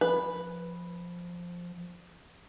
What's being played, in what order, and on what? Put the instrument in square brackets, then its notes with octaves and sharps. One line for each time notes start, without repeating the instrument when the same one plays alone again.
[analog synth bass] F3 [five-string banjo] B4